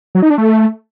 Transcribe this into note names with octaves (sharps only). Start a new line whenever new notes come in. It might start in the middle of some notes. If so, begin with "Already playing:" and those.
F#3
D#4
D4
A3